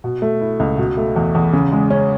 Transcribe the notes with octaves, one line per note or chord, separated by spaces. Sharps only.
B2
A3
E4
C#2
B2
A3
E2
E2
C#3
G#3
C#4